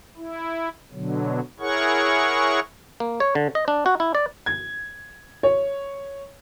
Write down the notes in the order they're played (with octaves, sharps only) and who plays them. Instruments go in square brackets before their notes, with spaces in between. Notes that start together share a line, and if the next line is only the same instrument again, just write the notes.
[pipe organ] E4
B2 D3 F#3
E4 G#4 A#4 C#5 F#5 C#6
[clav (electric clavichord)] A#3
C#5
D3
D#5
D4
F#4
E4
D5
[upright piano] G#6
C#5